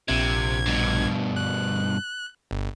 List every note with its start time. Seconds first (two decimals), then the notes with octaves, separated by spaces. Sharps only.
0.08 A#1 C3 G#6
0.66 G2 B2
1.36 F#6
2.51 G1